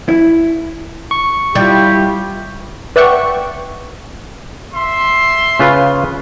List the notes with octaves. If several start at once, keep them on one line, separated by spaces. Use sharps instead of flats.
E4
C#6
G3 E4 F4 G4
B4 D5 E5 F#5 G5 C#6
E5 C6
C#3 F4 B4